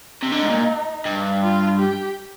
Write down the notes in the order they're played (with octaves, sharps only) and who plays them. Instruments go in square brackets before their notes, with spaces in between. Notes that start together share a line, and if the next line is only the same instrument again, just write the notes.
[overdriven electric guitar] C3
[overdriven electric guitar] D3 [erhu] D#4
[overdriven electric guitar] G#2
A#2
G2
[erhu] F4
G4